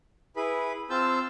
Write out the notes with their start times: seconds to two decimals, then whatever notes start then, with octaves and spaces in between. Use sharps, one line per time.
0.36 E4 G#4 B4 B5
0.90 C4 F4 A5 E6 G6